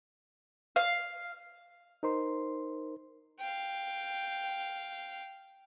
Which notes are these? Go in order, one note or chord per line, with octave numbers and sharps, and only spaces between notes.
F5
D#4 A#4 C5 C6
F5 G5